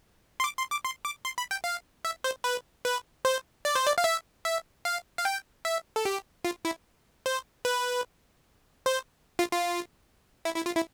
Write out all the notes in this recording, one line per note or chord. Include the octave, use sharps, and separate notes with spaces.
C6
D6
C6
D6
C6
D6
C6
B5
G5
F5
E5
C5
B4
B4
C5
D5
C5
D5
F5
E5
E5
F5
F5
G5
E5
A4
G4
F4
E4
C5
B4
C5
F4
F4
E4
E4
F4
E4